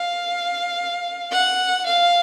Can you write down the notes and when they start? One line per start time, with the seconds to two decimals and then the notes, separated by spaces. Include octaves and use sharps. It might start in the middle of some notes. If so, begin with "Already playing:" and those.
Already playing: F5
1.32 F#5
1.86 F5